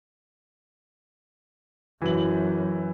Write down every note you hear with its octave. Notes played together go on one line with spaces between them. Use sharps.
F#2 E3 F#3 F#7